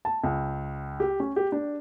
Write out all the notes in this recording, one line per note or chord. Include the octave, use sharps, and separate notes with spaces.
A5
C#2
G4
C#4
G4
D4